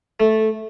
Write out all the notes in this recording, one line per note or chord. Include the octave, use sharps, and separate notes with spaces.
A3